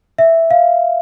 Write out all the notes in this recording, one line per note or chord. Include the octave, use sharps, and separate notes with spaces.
E5
F5